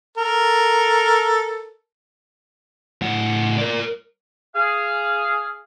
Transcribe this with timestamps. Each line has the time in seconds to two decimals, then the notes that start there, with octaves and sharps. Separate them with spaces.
0.18 A4 A#4
3.02 A2 F#5
3.58 A#4 D5
4.55 G#4 F5